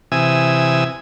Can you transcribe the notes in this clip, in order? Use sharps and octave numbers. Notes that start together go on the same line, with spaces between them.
C3 E3 G#5 D#6 E6